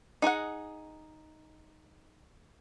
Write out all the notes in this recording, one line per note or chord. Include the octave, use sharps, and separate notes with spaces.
D#4 G#4 D#5 F#5